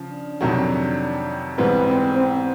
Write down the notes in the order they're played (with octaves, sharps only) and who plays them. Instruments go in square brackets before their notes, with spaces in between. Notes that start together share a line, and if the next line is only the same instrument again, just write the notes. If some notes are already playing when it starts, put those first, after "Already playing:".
Already playing: [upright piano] C#3 F3
[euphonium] D4
[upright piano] F2 C3 D#3 F#3
[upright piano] G#2 E3 G3 B3 [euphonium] C4
[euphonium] C4
C4